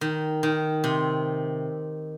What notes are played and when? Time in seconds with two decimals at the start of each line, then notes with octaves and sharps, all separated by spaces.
0.01 D#3
0.43 D#3
0.84 C3